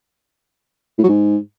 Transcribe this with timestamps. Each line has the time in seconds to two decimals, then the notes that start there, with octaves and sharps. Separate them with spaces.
0.98 A2
1.04 F#3
1.09 G#2